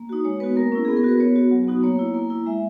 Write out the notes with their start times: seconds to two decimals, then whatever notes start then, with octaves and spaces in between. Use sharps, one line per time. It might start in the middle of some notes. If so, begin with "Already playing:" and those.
Already playing: A#3
0.09 D#4 F#4
0.25 G#3 C#5
0.40 B3 B4
0.44 F#4
0.56 A#3 A#4
0.72 C#4 E4
0.85 B3 G#4
0.97 A#4
1.04 F#4 B4
1.20 B3 C#5
1.36 F#4
1.51 F#3
1.67 B3 D#4 F#4
1.83 A#3 C#5
1.99 E4
2.14 A#3
2.30 E4
2.46 G#3 E5